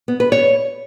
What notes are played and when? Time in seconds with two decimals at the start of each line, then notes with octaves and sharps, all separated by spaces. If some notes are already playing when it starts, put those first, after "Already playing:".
0.08 B3
0.20 B4
0.32 C#5